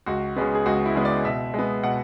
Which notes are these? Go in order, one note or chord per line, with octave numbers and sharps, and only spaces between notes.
C#2 F#4
C#3 G#3 B3
G#4
C#2 F#4
E4
C#3 G#3 B3
D5
B2 E5
G#3 B3
B2 F#5